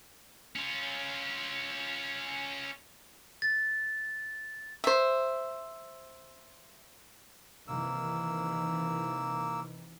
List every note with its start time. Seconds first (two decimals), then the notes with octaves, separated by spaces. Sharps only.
0.56 C#4 F4
3.42 A6
4.84 C5 E5
7.68 C3 D#3 E3 A#3 E6